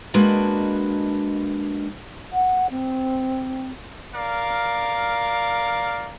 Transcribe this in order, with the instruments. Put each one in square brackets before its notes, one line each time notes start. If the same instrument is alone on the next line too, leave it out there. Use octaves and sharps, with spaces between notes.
[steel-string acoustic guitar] G#3 A#3 D4 F#4 B4 D#5
[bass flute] F#5
C4
[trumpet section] A#4 D5 F5